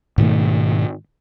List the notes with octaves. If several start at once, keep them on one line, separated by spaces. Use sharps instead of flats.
G#2 B2 D#3 A3